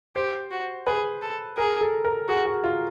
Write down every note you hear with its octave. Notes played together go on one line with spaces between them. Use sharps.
G4 C5
F#4
G#4 B4
A4
G#4 A#4
A4
A#4
F#4 G#4
F#4
F4